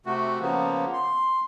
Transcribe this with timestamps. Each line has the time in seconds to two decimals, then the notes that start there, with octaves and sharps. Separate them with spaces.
0.06 C3 A3 F#4
0.40 C#3 F3 A#3 B3
0.93 C6